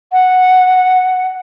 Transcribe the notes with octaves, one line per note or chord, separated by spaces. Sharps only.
F#5